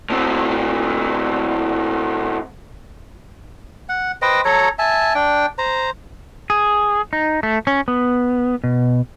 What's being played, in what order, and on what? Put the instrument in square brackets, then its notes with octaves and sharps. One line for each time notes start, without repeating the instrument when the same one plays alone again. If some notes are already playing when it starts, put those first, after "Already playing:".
[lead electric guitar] A2 C4
[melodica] F#5
B4 C5 D#5 G5
F#3 A4 C#5 A#5
E5 G#5 A5
D4 G5
C5 A#5
[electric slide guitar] G#4
D#4
A3
C#4
B3
B2